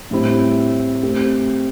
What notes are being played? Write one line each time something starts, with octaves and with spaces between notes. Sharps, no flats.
A2 G3 C4 E4
A3 C4 G4